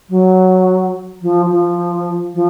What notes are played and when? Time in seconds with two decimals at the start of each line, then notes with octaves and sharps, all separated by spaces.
0.10 F#3
1.22 F3
1.50 F3
2.35 F3